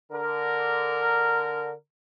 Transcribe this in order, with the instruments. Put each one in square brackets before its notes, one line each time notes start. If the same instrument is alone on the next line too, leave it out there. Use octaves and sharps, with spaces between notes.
[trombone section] D3 A#4